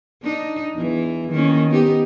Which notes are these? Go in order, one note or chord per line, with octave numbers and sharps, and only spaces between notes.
D4 D#4
E2 E3
D#3 A#3 C#4
B3 D#4 G4